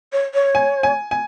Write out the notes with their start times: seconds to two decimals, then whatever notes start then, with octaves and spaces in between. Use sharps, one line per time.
0.12 C#5
0.34 C#5
0.55 G#5
0.83 G#5
1.11 G#5